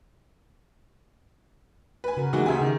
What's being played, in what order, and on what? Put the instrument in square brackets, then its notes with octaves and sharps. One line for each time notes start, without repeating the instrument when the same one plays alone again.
[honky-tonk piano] B4 G#5
[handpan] C#3 F#4 A#4
[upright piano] E3 A#3 [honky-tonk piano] G#3 F#4 [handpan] D#4
[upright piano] D2 C#3 [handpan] G4 [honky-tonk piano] E5 G#5
[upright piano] D#3 [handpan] G#4